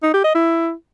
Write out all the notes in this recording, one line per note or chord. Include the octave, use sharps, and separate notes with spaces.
D#4
G4
D#5
E4